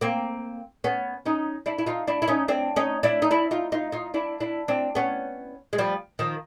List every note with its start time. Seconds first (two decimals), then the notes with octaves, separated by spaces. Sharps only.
0.01 A#3 C4
0.84 B3 C#4
1.26 C#4 D#4
1.66 D4 E4
1.78 E4
1.86 D#4 F4
2.07 D4 E4
2.22 E4
2.28 C#4 D#4
2.48 C4 D4
2.76 C#4 D#4
3.03 D4 E4
3.22 D#4
3.31 D4 E4
3.51 D#4 F4
3.72 D#4 F4
3.92 D#4 F4
4.14 D4 E4
4.40 D4 E4
4.68 C4 D4
4.95 B3 C#4
5.73 G#3
5.78 F3 G3
6.19 D#3 F3